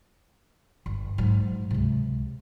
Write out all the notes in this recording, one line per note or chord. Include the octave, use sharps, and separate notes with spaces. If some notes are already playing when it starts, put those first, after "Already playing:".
G1
G#2 F#3
C#2 C3